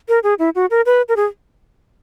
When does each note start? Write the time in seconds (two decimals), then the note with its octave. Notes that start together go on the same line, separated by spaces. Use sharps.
0.09 A#4
0.23 G#4
0.39 E4
0.55 F#4
0.71 A#4
0.86 B4
1.09 A#4
1.16 G#4